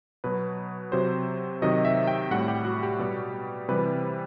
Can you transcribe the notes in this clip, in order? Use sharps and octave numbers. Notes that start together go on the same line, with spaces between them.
B2 F#3 B4
C3 F#3 C5
C3 D#3 F#3 D#5
E5
G5
A2 G3 F#5
G4
F#4
G4
B2 G3
C3 E3 G3 B4